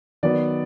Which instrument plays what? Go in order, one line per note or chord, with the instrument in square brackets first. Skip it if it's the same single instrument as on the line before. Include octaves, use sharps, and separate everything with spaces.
[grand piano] D#3 F#3 B3 D5